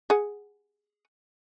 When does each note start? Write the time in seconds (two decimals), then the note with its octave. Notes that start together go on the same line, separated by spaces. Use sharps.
0.10 G#4 F#5